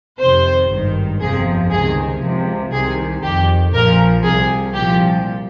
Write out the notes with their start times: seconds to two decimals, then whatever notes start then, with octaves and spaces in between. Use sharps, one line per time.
0.19 F2 C3 D#3 C5
0.70 G#1 G2 D#3
1.20 G1 F2 C3 F3 G#4
1.71 C#2 C3 D#3 G#4
2.21 C#2 C3 F3
2.72 C2 C3 D#3 G#4
3.22 F2 D#3 G4
3.73 A#1 A#2 F3 A#4
4.23 C2 C3 F3 G#4
4.74 C2 A#2 F3 G4